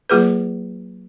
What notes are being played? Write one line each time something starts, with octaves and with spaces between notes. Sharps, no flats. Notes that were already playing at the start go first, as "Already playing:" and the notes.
F#3 A#3 F4 G#4 B4